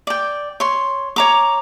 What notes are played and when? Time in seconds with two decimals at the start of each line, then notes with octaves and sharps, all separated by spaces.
0.07 D5 G5
0.60 C#5 C6
1.16 C#5 A#5 D6